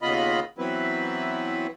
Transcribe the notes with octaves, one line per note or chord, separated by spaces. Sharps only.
D#2 C#3 B3 F4 D#5 B5
E3 F#3 B3 C4 E4 B4